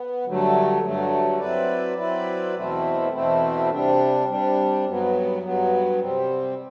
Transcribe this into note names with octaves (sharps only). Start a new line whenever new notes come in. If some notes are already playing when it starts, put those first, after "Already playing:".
Already playing: B3
G2 D3 F#3 A3
G2 D3 F#3 A3
F#3 C4 E4 B4 D5
F#3 C4 E4 B4 D5
E2 B2 A3 C4 E4
E2 B2 A3 C4 E4
C3 G3 D4
C3 G3 D4
G2 F#3 B3
G2 F#3 B3
C3 G3 C4